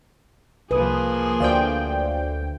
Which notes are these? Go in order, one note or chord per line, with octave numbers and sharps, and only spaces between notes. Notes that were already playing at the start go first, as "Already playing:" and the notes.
C2 F3 A#3 G#4 B4 D#6
D2 C5 D5 F5 G5